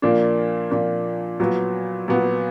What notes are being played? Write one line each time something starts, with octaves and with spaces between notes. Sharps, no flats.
A#2 F3 A#3 D4
A#2 F3 A#3 D4
A#2 F#3 B3
A#2 F#3 B3